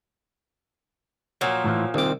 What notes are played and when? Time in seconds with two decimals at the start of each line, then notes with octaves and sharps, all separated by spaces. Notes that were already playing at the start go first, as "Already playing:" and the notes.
1.41 A#2 F3 F#3
1.65 A2 E3 F4
1.94 C2 D#3 C4 D6